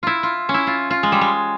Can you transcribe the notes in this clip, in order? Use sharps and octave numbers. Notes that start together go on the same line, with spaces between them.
E4 F4
F4
C#4
E4
F4
F4
G#3
G3
G#3